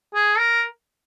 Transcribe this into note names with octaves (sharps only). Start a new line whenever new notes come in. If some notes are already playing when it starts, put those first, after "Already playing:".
G#4
A#4